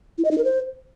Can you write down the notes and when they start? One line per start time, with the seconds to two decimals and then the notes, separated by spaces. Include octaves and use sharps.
0.18 E4
0.25 D#5
0.31 D#4
0.38 A#4
0.44 C5